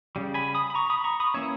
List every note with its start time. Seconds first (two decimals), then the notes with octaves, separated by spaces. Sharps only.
0.16 C#3 G3
0.34 G#5 B5
0.55 B5 D#6
0.70 B5
0.75 A#5 C#6
0.90 B5 D#6
1.04 A#5 C#6
1.20 B5 D#6
1.34 E3 A#3 C#4 C#5 E5